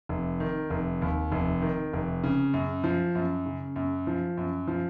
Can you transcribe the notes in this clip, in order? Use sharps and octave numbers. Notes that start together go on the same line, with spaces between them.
F1
D#3
F1
D#2
F1
D#3
F1
C#3
F#2
F3
F#2
C#3
F#2
F3
F#2
F3